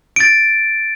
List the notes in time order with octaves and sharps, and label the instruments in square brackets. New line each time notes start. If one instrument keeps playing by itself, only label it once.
[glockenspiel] A6 D7